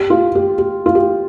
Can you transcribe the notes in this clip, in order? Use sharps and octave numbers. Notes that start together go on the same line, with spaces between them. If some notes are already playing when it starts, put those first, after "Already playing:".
Already playing: G4
F4
G4
G4
F4
G4